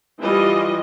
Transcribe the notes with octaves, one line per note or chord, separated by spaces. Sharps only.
E3 G3 F4 D#5